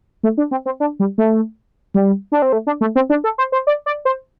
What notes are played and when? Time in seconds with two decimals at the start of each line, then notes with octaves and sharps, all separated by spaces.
0.23 A3
0.38 D4
0.51 C4
0.66 C4
0.80 D4
1.00 G3
1.18 A3
1.94 G3
2.32 D4
2.42 C4
2.53 A3
2.67 D4
2.81 A3
2.95 C4
3.10 D4
3.24 A4
3.38 C5
3.52 C5
3.67 D5
3.86 D5
4.05 C5